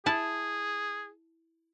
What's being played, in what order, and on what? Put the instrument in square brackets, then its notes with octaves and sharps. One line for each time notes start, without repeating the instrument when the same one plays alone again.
[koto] E4 A5 [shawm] G#4